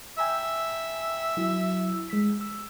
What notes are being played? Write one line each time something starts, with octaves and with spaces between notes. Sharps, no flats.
E5 G5 G#5 A#5
F#3 E4
G#3 E6 B6
E6